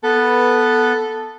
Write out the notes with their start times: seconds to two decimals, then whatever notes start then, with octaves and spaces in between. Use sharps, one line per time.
0.04 B3 A4 B4